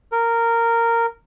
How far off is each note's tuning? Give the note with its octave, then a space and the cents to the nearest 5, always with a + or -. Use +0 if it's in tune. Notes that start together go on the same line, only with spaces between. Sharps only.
A#4 -10